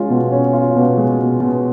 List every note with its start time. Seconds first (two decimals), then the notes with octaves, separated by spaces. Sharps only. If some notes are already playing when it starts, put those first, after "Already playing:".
Already playing: G#3 C#4 F4
0.10 B2
0.32 C#4
0.53 F4
0.76 B2
0.97 G#3
1.19 B2
1.40 B2